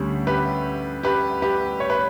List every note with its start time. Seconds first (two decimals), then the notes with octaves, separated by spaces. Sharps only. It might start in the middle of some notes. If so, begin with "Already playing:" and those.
Already playing: D2 D3 G3 C#4
0.27 G4 B4
1.03 G4 B4
1.42 G4 B4
1.80 C#5
1.90 B4